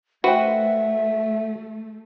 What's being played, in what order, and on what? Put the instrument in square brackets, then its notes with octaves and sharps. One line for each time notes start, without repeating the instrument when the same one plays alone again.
[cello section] A3 [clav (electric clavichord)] F#4 [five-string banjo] B4 C5 G5 [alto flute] E5